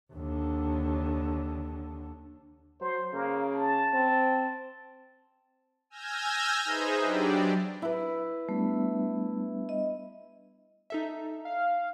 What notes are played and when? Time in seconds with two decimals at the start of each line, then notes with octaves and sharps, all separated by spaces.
0.13 D#2 D3
2.81 F#3 C5
3.13 C#3 A#3
3.54 A5
3.94 C4
5.90 G#5 E6 F6 G6 G#6 A#6
6.65 D#4 G#4 B4 C5 D#5 E5
7.00 F#3 D4 G4 D5
7.82 E4 B4
8.49 G3 A3 B3 D4
9.69 D#5
10.90 D#4 A4 E5
11.45 F5